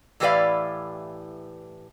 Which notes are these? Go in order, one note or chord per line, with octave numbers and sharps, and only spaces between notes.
A2 E3 G4 B4 D5 F5